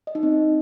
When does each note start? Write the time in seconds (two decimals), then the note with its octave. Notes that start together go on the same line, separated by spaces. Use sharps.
0.07 D#5
0.15 D#4
0.23 C4